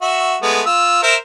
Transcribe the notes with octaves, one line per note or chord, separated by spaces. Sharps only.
F#4 E5
G#3 A3 B3
F4 E6
A#4 C5 E5